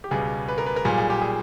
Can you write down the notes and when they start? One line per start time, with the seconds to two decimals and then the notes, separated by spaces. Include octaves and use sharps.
0.04 G4
0.11 C#2 B2 G3 G#4
0.48 B4
0.58 A#4
0.66 B4
0.76 A#4
0.85 B1 A#2 G3 G#4
0.98 G#4
1.10 G4
1.22 G#4